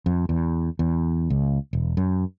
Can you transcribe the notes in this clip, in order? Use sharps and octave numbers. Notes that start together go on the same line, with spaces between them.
F2
E2
E2
C#2
E1
F#2